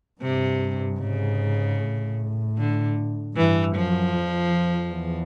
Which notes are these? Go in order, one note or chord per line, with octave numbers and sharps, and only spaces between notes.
G2 C3
G#2 C#3
A2
D3
G2 E3
F#2 F3
F2
E2